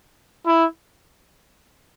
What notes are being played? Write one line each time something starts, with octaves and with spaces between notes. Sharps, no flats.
E4